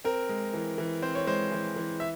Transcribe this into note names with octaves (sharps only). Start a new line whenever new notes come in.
C4 A#4
G#3
E3
E3
C4 C5
C#5
G#3 C5
E3
E3
E5